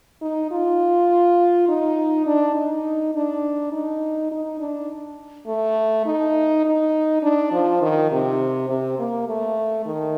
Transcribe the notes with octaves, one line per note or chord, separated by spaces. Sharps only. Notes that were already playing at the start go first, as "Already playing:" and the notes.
D#4
F4
D#4
D4
D#4
D4
D#4
D#4
D4
A3
D#4
D#4
D4
F3
D#3
C3
C3
A#3
A3
D#3